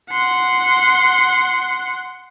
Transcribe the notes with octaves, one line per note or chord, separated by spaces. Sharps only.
F#5 C6